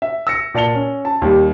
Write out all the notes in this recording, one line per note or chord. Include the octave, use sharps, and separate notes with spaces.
E5
E6 A#6 C#7
A#2 D5 A5 C#7 F7 G7
C#4
A5
D#2 G3